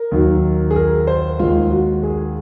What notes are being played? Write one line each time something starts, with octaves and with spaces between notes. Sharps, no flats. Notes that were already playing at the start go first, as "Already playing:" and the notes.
Already playing: A#4
D#2 D#3 F#3
G#4
A#4
C5
D#2 D#3 G#3 F4
F#4
G#4